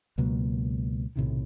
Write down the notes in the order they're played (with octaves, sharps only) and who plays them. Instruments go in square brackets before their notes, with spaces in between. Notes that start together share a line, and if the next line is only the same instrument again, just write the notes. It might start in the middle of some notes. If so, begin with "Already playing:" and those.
[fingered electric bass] C#2 B2 F#3 A#3
B1 A2 C3 D#3